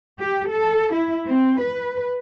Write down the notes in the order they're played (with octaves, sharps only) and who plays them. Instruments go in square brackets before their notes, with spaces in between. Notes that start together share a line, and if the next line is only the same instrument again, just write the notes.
[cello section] G4
A4
E4
C4
B4